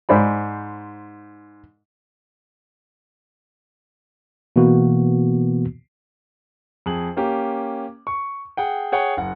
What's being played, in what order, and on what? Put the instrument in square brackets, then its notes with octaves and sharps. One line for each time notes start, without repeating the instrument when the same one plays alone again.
[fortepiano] G#2 C5 D5 B5
[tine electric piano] B2 E3 A#3 B3 F#4
[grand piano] F2 G#4 F#7
A#3 C#4 G4
C#6
G#4 F#5 G5
G#4 C#5 F#5 G5
F#1 F#5